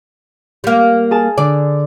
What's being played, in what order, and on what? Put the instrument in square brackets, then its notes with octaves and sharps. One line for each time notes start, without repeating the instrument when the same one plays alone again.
[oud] G3 A#3
[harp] G#4 A5
[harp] D3 [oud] D5